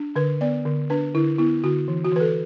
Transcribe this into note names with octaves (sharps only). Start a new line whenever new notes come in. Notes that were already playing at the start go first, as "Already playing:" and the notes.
Already playing: D4
D3 B4
B3 D5
D3
D4 B4
D3 E4
B3 E4
D3 F#4
E3
F#4
E3 B4
A4